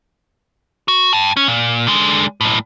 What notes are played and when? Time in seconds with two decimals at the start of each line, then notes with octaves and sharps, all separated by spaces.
0.88 F#4
1.13 G5 A5
1.37 C#4
1.48 A#2
1.87 D3 G#3
2.41 B1 A2